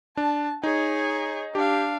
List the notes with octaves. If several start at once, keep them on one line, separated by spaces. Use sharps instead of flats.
D4 A5
D#4 G#4 C#5
D4 G4 F5